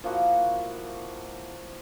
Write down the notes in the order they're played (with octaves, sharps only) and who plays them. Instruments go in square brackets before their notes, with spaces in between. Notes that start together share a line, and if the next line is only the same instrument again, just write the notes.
[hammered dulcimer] F3 A#3 E4 F#4